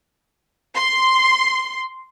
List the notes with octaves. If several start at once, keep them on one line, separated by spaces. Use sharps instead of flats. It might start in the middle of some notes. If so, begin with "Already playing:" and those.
C6